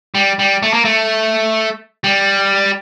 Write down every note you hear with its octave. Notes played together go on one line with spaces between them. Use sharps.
G3
G3
A3
A#3
A3
G3